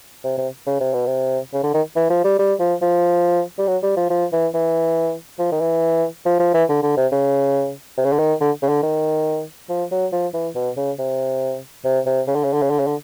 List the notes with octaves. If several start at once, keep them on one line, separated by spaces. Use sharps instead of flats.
C3
C3
C#3
C3
B2
C3
C#3
D3
D#3
E3
F3
G3
G3
F3
F3
G3
F#3
G3
F3
F3
E3
E3
F3
D#3
E3
F3
F3
E3
D3
D3
C3
C#3
C3
C#3
D3
D#3
D3
C#3
D3
D#3
F3
F#3
F3
E3
B2
C#3
C3
C3
C3
C#3
D3
C#3
D3
C#3
D3
C#3
D3